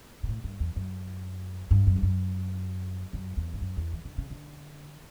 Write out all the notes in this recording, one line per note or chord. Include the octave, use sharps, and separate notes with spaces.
B2
A2
G2
E2
F#2
G2
F#2
G2
F#2
F#2
E2
G2
F#2
E2
E3
D3
C#3
D3